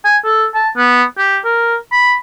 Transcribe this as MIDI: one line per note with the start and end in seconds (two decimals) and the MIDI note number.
0.05 0.17 80
0.24 0.46 69
0.55 0.69 81
0.77 1.03 59
1.18 1.39 67
1.44 1.75 70
1.92 2.14 83